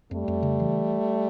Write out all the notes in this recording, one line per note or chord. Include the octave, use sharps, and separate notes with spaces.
F2 G3 A3
F2
C#3
E3